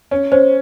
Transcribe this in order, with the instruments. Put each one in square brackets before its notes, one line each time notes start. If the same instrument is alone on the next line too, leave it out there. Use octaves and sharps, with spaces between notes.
[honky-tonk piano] C#4
[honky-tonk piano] C#4 [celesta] C5